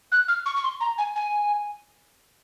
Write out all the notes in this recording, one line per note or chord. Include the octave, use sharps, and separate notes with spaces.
F#6
F6
C#6
C#6
C6
A#5
G#5
G#5